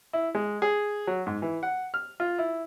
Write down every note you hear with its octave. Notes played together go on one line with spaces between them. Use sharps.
E4
G#3
G#4
F#3
G#2
E3
F#5
F6
F4
E4